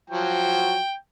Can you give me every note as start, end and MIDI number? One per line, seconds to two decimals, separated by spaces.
0.10 0.80 53
0.10 0.80 54
0.10 0.80 66
0.10 0.95 79